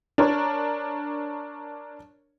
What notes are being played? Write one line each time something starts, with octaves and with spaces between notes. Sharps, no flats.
D4 A#4 C#5